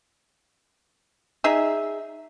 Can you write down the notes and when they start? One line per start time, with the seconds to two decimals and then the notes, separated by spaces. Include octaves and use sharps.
1.44 D#4 G#4 E5